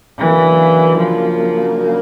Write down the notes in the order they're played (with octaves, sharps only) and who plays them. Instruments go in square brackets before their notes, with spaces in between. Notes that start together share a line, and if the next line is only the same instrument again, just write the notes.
[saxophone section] C#3 F#3 A#3 D4 [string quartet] E3
[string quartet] F3